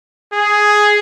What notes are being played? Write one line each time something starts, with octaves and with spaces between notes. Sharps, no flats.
G#4